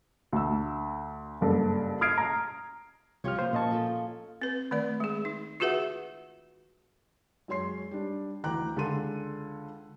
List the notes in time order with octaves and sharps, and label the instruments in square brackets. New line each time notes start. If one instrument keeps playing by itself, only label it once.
[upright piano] D2 E6
F#1 G2 A4
D#6 F6 G#6 C7 D7
A#5
[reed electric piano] C2 G4 F6 [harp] F3 F4 C#5
[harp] A#3 F4 [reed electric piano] C5
[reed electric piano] A#2 D#5 A5 [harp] C#4 C#6
[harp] F3 A4
[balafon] C4 B4
D#3 A3 D5
G#3 G#4
D#4
F4 F#4 G#4 B4 E5 F#5
[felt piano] F#2 G#3 C#5 C6 C7
G3 D4
D2 E3 G5 A#5 D6 F#6
C#2 D3 G#3 A4 C6 D#7